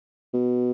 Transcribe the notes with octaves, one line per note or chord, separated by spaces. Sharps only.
B2